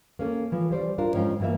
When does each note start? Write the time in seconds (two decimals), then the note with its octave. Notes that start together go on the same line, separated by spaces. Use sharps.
0.19 A#3 C#4 A4
0.52 E3 F3
0.71 G3 C5 D5
0.98 D4 F4 A#4
1.13 F2 G#2 F3 C#4 G5
1.40 G2 E3 A#3 B3 E5